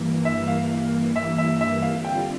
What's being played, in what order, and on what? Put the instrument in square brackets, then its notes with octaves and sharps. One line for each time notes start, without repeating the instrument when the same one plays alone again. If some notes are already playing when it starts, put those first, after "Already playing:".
Already playing: [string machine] G2 E3 A#3
[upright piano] E5
F5
E5
E5
E5
[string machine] D3 G3 C4 F4 [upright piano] F5
[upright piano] G5